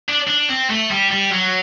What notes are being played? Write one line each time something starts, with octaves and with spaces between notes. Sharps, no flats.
D4
D4
C4
A3
G3
G3
F#3